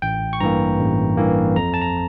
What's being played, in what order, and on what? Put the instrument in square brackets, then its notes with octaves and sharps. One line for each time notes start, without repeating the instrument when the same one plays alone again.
[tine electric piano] A1 G5
C#6
G2 E3 A#3 A#5
A1
G2 E3 A#3
F2 A#5
A5
A#5